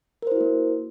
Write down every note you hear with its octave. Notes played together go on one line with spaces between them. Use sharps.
A#3 E4 F#4 A#4 C5